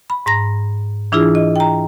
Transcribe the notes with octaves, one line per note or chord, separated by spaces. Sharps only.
B5
G#2 A#5 A#6
E3 D4 E4 F4 G#4
D#5
G5 A#5